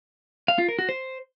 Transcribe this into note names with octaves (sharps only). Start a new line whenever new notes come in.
F5
F4
A#4
F#4
C5